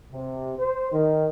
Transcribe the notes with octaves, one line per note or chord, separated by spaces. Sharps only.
C3
C5
D#3